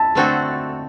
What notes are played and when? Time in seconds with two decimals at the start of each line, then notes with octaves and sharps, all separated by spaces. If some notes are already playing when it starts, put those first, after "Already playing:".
Already playing: E4 A5
0.15 D3 A3 C4 F#4 A4